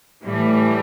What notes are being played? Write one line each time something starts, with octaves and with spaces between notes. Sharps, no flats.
A2 E3 G3